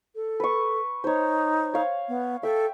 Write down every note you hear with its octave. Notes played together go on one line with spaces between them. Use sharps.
A4
B4 C#6
D#4 C5 C#5
C#5 F5
B3
A4 E5 G5